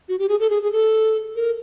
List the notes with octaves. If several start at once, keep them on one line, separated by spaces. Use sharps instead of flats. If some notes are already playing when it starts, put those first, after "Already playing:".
F#4
G4
G#4
A4
G#4
G#4
A4
A#4